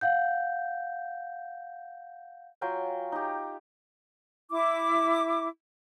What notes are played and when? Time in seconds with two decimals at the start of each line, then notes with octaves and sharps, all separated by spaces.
0.01 F5 F#5 G6
2.61 F#3 F4 G5 G#5
3.12 D#4 G4
4.50 E4 D6